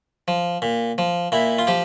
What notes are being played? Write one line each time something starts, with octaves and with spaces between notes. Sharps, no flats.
F3
A#2
F3
A#2 E4
F4
F3 G4